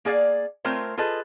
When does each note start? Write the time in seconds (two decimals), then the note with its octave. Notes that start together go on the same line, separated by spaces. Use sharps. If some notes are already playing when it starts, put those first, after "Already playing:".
0.05 A#3 G#4 D5 E5 F5
0.64 A3 C4 F4 A#4 C5 C#5
0.97 F4 G#4 A4 B4 D#5